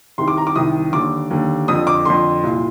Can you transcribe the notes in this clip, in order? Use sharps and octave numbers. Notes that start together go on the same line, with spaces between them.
C2 C3 D#3 C6
D6
A#5
D6
C2 C3 D#3 D#6
D#2 D3 D6
D#2 D3
F2 D3 D#6
D6
F2 D3 C6
C2 A#2